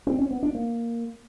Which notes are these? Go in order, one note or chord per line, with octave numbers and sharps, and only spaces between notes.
C4
C#4
B3
D4
A#3